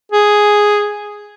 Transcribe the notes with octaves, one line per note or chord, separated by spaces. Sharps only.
G#4